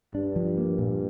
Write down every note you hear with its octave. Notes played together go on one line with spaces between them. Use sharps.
G2 D4
F3
A#3
A#2